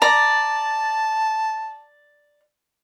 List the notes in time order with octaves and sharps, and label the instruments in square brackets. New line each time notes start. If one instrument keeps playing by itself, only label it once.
[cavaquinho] D5 A#5 [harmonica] A5